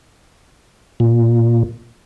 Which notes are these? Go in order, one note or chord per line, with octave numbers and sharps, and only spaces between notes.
A#2